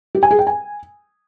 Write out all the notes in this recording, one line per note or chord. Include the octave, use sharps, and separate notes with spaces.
G4
G#5
G#4
G5
G#5